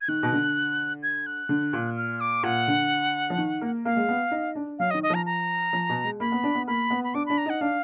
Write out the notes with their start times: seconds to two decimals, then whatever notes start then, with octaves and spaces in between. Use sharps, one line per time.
0.01 G#6
0.08 D#3 F#6
0.23 B2
0.33 D3
1.03 G#6
1.26 F#6
1.49 D3
1.73 A#2
1.97 F6
2.20 D6
2.43 A#2 F#5
2.68 D3
3.30 F3
3.38 D#3
3.61 A#3
3.85 A#3 F5
3.96 G#3
4.09 B3
4.31 D#4
4.55 D4
4.79 F#3 F5
4.91 D#5
4.94 D#3
5.03 D#5
5.10 F3 A#5
5.26 A#5
5.73 F3
5.89 B2
6.04 G#3
6.20 A#3 B5
6.32 B3
6.43 D4
6.55 B3
6.67 A#3 B5
6.90 B3
7.04 B5
7.14 D4 D6
7.26 D4 B5
7.38 A#5
7.46 D#4 F#5
7.61 D4 F5